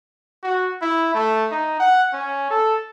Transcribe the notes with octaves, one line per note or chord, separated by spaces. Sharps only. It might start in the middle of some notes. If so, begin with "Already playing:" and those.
F#4
E4
A3
D#4
F#5
C#4
A4